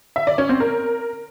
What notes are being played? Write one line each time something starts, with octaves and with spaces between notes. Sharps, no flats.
E5
D5
C#4
C4
A#4